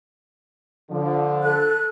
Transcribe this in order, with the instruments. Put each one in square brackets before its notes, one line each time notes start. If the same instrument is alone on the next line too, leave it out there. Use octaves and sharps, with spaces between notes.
[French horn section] D3 F3
[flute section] A4 F#6